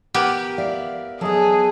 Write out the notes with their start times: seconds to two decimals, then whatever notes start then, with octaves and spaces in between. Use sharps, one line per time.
0.14 B3 G4 A#4
0.58 D5 E5 F5
1.21 F#3 B3 G#4 A4 D#5